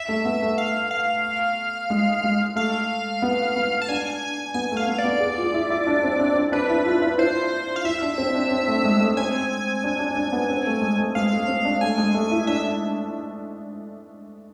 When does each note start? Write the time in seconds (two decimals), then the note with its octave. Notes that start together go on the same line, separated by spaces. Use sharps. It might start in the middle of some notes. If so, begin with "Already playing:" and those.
Already playing: E5
0.09 A3
0.25 B3
0.42 A3
0.58 F5
0.91 F5
1.90 G#3
2.24 G#3
2.56 A3 F5
3.22 B3
3.56 B3
3.82 A5
3.88 D4 G#5
4.54 B3 G#5
4.72 A3 F5
4.88 B3
4.98 D5
5.04 B3
5.20 G#4
5.38 F4
5.54 E4
5.70 E4
5.87 D4
6.04 C4
6.19 D4
6.36 D4
6.52 D4 B4
6.70 E4
6.86 F4
7.02 E4
7.18 E4 C5
7.76 F5
7.84 E4 E5
8.02 D4
8.18 C4
8.35 D4
8.51 C4
8.68 A3
8.84 G#3
9.00 A3
9.17 C4 G#5
9.84 D4
9.99 D4
10.16 D4
10.32 B3
10.49 C4
10.66 A3
10.82 G#3
10.98 A3
11.15 G#3 F5
11.32 A3
11.48 C4
11.65 D4
11.81 A3 G#5
11.98 G#3
12.15 A3
12.31 E4
12.47 D4 E5